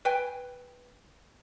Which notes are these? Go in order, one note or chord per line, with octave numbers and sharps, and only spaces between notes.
B4 G5 G#5